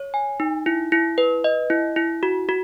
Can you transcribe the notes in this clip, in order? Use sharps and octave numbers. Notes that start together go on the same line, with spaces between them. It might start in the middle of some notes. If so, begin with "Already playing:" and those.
Already playing: C#5
G#5
D#4
E4
E4
B4
D#5
E4
E4
F#4
F#4